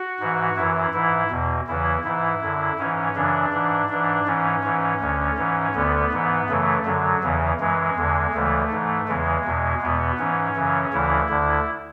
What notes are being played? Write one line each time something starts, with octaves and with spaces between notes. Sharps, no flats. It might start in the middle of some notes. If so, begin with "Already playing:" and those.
Already playing: F#4
G#2 E3
F#2 E3 E4
G#2 E3 E4
E2 B2
E2 C#3 E3 E4
G#2 E3 E4
F#2 D3
G#2 E3 C#4
F#2 C#3 E3 D4
G#2 E3
G#2 E3 D4
G#2 E3 C#4
G#2 E3
D2 D3
G#2 E3
D2 D3 B3
G#2 E3
F#2 C#3 E3 A3
F#2 D3 F#3
E2 C#3 E3
F#2 E3 G#3
E2 D3
D2 C#3 E3 A3
G#2 E3
E2 C#3 E3 G#3
E2 B2
E2 B2 B3
G#2 E3 C#4
F#2 C#3 E3
D2 C#3 E3 E4
D2 D3